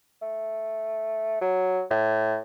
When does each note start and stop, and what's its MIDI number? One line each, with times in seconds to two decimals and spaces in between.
0.22 1.38 57
1.41 1.81 54
1.91 2.38 45